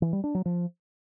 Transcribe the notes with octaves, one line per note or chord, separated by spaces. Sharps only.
E3
G3
D4
F#3
F3